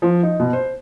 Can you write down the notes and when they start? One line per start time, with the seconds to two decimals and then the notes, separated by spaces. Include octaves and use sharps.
0.02 F3
0.23 D#4
0.40 B2
0.53 C5